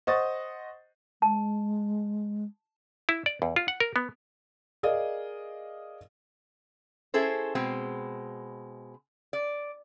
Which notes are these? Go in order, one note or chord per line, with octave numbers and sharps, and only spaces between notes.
C5 D#5 F#5 C#6 D#6 A6
G#3 A5
E4
D5
E2
F4
F#5
A#4
B3
G#4 A#4 D5 D#5 F5
C#4 E4 G#4 A4 C5
B2 G#3 C4
D5